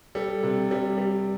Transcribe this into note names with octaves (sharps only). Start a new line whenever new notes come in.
G3 A4
C3
G3
G3